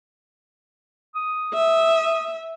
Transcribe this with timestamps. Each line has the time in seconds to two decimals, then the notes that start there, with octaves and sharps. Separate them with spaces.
1.15 D#6
1.54 E5